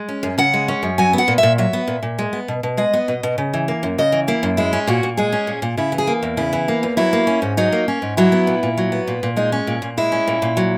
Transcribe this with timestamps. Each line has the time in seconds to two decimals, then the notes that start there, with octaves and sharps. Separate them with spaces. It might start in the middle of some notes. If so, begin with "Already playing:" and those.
Already playing: G#3
0.08 C#4
0.23 F#2
0.38 C#3 F#5
0.54 G#3
0.68 C#4
0.83 F#2
0.98 F#3 G#5
1.13 B3 F#5
1.28 A#2
1.38 E5
1.43 A#2
1.58 F#3 E5
1.73 B3
1.88 A#2
2.03 A#2
2.19 G#3
2.33 B3
2.48 B2
2.63 B2
2.77 G#3 D#5
2.93 B3
3.08 B2
3.23 B2
3.38 C#3
3.54 E3
3.68 A#3
3.83 F#2
3.98 C#3 D#5
4.12 E3
4.28 A#3 E4
4.43 F#2
4.57 G#3 E4
4.73 C#4
4.87 A#2 F#4
5.03 A#2
5.17 G#3 G#4
5.32 C#4
5.47 A#2
5.62 A#2
5.77 C#3 E4
5.92 E3
5.98 G#4
6.07 A#3
6.23 E2
6.37 C#3 E4
6.53 E3
6.68 A#3
6.83 E2
6.97 F#3 E4
7.13 A#3
7.27 C#4
7.42 G#2
7.57 F#3 D#4
7.72 A#3
7.88 C#4
8.02 G#2
8.17 F#3 E4
8.32 B3
8.47 A#2
8.63 A#2
8.78 F#3
8.92 B3
9.08 A#2
9.23 A#2
9.37 G#3 D#4
9.52 C#4
9.67 A#2
9.82 A#2
9.97 G#3 E4
10.12 C#4
10.27 A#2
10.42 A#2
10.57 F#3